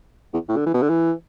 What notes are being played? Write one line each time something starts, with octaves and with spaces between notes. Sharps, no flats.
E2
A2
D3
E3
B2
D3
E3